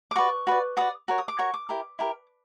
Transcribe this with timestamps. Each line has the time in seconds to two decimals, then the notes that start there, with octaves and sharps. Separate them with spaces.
0.11 D6
0.16 F#4 B4 D5 C#6
0.47 F#4 B4 D5
0.77 F#4 B4 D5 D#6
1.08 F#4 A#4 C#5
1.18 D#6
1.28 D6
1.39 F#4 A#4 C#5 C#6
1.54 D6
1.69 E4 G4 A#4
1.99 E4 G4 A#4